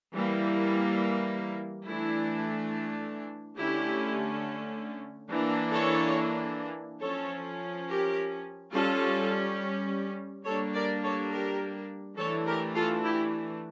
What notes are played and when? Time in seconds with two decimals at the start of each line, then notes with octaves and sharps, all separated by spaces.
0.13 E3 G3 A#3
1.85 E3 A3 D4 E4
3.57 D3 A3 C#4 E4 G4
5.29 E3 A#3 D4
5.72 A4 C#5
7.01 F3 C#4 A4 C#5
7.88 G4 A#4
8.73 G3 C#4 F4 A4
10.45 G3 A#3 D4 A4 C#5
10.74 A#4 D5
11.02 A4 C#5
11.31 G4 A#4
12.17 E3 A3 D4 A4 C#5
12.46 G4 A#4
12.75 F4 A4
13.03 E4 G4